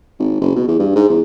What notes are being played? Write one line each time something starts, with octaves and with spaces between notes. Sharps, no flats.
G#1
F#1
B2
E2
G2
G#2
E2